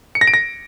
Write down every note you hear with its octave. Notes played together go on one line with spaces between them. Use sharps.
C#7
A#6
D7
A#6